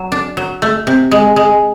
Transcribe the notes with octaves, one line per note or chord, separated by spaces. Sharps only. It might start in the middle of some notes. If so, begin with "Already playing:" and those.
Already playing: F#3
D4
F#3
A3
C3
G#3
G#3